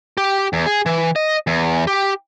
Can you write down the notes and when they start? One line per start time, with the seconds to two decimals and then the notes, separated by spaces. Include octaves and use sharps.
0.18 G4
0.53 E2
0.66 G#4
0.86 E3
1.16 D#5
1.47 E2
1.87 G4